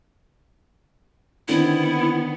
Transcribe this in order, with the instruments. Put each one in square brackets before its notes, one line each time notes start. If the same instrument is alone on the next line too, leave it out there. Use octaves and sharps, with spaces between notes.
[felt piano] D3 D#3 C4 [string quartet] B3 [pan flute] E4